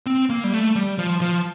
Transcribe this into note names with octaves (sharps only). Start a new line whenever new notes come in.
C4
A#3
G3
A3
G3
F3
F3